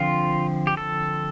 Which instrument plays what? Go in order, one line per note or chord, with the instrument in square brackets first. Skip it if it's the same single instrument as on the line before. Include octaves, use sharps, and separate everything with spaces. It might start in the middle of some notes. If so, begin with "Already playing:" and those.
Already playing: [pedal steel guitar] D3 F3 C4 F4
G4
A4